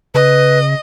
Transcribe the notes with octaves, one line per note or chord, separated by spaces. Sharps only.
C#3 B4 D#5